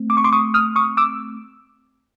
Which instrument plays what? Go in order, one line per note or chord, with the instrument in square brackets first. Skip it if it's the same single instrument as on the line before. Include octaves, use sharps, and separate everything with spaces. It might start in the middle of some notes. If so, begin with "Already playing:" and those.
Already playing: [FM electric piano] A3 C4
D6
C#6
C6 D6
C#6 D#6
D#6 F6
C#6 D#6
D6 E6